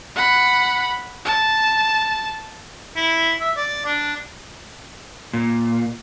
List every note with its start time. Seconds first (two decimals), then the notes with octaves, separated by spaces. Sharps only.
0.16 F#5 B5
1.25 A5
2.96 E4
3.41 E5
3.57 D5
3.86 D4
5.33 A#2